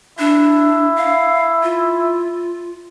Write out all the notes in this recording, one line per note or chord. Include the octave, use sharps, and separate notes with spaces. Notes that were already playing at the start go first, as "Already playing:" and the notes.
D4 E4
F5
F4